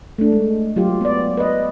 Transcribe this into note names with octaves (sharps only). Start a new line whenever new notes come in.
A3 D4
G#3
F#3 F4 G4
B3 D5
B4 D#5